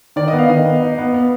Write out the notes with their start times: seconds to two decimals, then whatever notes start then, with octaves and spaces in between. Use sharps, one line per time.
0.16 D#3 D5
0.28 D#5
0.33 B3
0.39 F5
0.49 D#3 D#5
0.65 B3
0.82 D#4
0.98 B3
1.14 B3